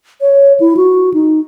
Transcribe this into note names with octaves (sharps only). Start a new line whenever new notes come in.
C#5
E4
F#4
D#4